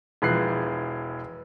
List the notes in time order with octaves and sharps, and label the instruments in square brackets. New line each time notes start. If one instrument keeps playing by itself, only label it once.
[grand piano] E1 E3 F3 F#6 C7